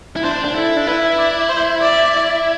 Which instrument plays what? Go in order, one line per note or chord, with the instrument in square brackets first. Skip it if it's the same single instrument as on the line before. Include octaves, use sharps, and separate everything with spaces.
[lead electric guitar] E4
[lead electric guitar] D4 [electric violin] C5
[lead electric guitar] D4
[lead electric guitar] E4 [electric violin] A4
[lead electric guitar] D4
[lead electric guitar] E4 [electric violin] B4
[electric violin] D5
C5
D5